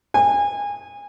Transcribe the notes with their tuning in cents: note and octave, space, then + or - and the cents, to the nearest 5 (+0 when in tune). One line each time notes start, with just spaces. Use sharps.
G#5 -30